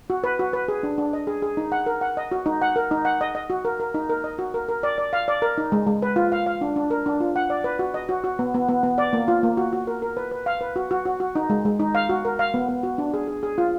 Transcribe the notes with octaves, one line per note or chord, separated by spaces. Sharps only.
F#4
B4
F#4
B4
G#4
D4
D4
D#5
G#4
G#4
D#4
F#5
A#4
F#5
D#5
F#4
D#4
F#5
A#4
D#4
F#5
D#5
D#5
F#4
A#4
A#4
D#4
A#4
D#5
F#4
A#4
A#4
D5
D5
F5
D5
A#4
D#4
G#3
G#3
B4
F4
F5
F5
D4
D4
A#4
D4
F4
F#5
D5
B4
F#4
D#5
F#4
F#4
B3
B3
B3
B3
D5
A#3
F4
A#3
F#4
F#4
A#4
A#4
B4
B4
F5
B4
F#4
F#4
F#4
F#4
D#4
G#3
G#3
D#4
F5
F#4
A#4
F5
B3
B3
F#4
D4
G#4
G#4
G#4
F4